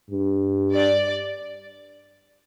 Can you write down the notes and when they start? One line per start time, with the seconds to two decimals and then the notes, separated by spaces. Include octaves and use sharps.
0.10 G2
0.73 D5